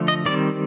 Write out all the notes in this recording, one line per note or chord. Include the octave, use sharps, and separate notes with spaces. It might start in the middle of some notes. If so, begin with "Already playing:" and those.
Already playing: D3 F3 A3
D#5
D#3 G3 C4 D5